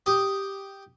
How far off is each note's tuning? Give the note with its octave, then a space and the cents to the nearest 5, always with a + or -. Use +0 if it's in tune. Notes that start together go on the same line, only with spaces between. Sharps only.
G4 +0 D#6 +0